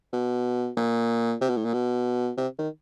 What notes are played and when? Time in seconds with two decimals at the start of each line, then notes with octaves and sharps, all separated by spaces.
0.13 B2
0.77 A#2
1.41 C3
1.49 B2
1.57 A2
1.65 A#2
1.73 B2
2.37 C3
2.58 D#3